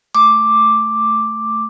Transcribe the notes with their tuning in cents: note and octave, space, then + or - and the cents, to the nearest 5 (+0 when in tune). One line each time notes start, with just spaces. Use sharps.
A3 +0 D6 +0